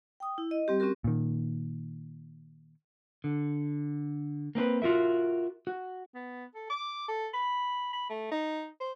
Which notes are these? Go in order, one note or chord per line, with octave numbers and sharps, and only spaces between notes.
G5 D#6
E4
D#5
G3 C4 G4
C4 C#4 F#4 G4 A#4
A#2 D#3
D3
A#3 C4 D4 B4
F4 F#4 A#4 E5
F#4
B3
A4
D6
A4
B5
B5
A3
D#4
C5